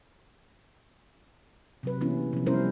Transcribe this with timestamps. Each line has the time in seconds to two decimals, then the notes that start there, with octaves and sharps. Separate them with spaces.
1.83 C3 F#3 B4
2.01 E3 A#3 B3 C#4 E4
2.33 C3 F3
2.46 G3 B3 C#4 E4 A#4 C5